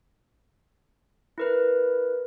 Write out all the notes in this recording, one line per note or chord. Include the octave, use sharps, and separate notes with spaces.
E4 A#4 B4